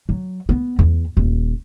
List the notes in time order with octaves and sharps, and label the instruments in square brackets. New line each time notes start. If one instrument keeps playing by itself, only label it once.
[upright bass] F#3
B3
E2
D#1